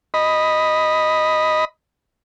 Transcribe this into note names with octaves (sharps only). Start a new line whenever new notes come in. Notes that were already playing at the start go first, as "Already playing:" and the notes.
D#5 B5